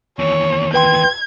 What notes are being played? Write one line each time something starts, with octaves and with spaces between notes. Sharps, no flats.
D#2 E3 C#5
B4 G5 C6 G#6